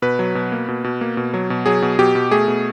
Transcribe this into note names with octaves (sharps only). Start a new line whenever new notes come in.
B2 B4
F#3
B2
A#3
B2
B2
A#3
B2
F#3
B2
F#3 G#4
B2
B2 G4
B2
A3 G#4
B2